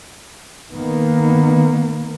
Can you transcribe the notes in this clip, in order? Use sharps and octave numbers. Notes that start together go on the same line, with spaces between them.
D#3 A#3 B3